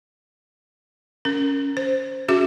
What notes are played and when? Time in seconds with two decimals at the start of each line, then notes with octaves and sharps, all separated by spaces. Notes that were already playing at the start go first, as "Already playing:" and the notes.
1.25 C#4 A#4
1.77 C5
2.28 C#4 F#4 G#4 E5 D6